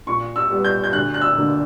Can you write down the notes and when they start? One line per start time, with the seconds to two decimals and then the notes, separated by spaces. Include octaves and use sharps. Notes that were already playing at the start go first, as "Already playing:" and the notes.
0.07 A#2 C#6
0.36 E6
0.50 G3 B3
0.64 G6
0.84 G6
0.93 D2 F#6
1.14 F#6
1.21 E6
1.37 D3 A#3